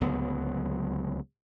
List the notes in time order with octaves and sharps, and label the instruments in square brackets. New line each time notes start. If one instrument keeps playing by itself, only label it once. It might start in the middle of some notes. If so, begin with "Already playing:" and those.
[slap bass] D1 C#2 F#3 B3